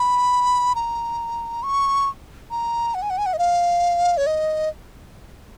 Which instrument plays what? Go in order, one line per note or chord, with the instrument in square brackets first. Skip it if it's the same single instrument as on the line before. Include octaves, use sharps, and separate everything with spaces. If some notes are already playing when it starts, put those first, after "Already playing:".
Already playing: [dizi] B5
A#5
C#6
A#5
F#5
G#5
F#5
G#5
F#5
D#5
F5
C#5
D#5